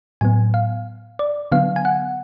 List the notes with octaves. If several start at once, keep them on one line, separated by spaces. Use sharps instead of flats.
A2 F#3 B3 G#5
F5
D5
D3 F#3 B3 F5
G#5
F#5